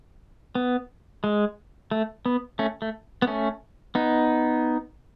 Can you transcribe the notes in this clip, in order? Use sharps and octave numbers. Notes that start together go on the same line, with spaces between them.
B3
G#3
A3
B3
A3 C#4
A3
B3
A3 C#4
B3 D#4